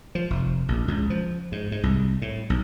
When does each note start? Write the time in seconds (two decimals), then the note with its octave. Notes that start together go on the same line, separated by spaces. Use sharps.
0.15 F3
0.30 F1
0.68 A#1
0.88 C#2
1.10 F3
1.52 G#2
1.72 G#2
1.83 C2
2.22 A2
2.50 B1